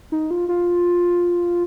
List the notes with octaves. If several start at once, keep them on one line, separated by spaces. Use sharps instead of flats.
D#4
F4
F4